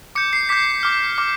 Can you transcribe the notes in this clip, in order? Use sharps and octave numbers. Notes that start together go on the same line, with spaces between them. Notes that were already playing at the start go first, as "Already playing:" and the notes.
D6 G6 C#7
C7
D6 G6 B6
D6 F6
D6 F6